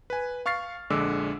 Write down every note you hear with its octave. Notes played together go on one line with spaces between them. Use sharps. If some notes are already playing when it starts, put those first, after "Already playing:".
B4 G#5
F5 C#6 F6 A6 C7
A#1 D3 G#3 D6 E6